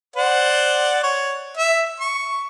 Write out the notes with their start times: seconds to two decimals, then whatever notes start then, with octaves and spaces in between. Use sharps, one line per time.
0.16 C5 D5 F#5
1.04 C#5
1.57 E5
2.00 C#6